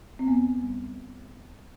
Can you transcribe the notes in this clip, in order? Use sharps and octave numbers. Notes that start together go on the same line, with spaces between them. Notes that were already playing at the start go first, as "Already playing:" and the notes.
C4
E2 B3
G3